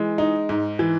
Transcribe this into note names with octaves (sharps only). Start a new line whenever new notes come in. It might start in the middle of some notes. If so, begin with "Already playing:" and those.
Already playing: E3 G#3
D#4
G#2
E3